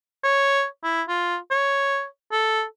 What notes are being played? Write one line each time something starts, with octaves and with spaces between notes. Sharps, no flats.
C#5
E4
F4
C#5
A4